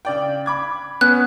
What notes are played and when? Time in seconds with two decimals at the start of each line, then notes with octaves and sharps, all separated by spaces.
0.05 C#3 D5 G5
0.46 B5 D6 G#6
1.01 B3 C#4 F#6